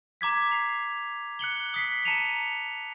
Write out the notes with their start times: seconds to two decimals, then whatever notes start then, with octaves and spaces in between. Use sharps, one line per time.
0.21 A#5 D6 G#6 B6
0.52 C7 F7
1.39 F#6 C#7 F#7 G7
1.74 D#6 B6 C7
2.05 A5 A#5 C7 C#7 D#7 F7